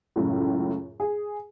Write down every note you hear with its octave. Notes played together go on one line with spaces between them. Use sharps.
C#2 F#2 A2
G#4